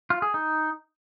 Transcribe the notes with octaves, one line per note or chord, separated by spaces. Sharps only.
F4
G#4
D#4